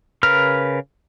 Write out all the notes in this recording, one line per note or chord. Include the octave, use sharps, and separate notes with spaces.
C#3 A#4 B4 F6